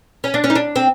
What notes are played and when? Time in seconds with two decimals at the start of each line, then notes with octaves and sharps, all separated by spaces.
0.24 C#4
0.34 D4
0.44 C#4
0.50 D#4
0.55 D4
0.76 C4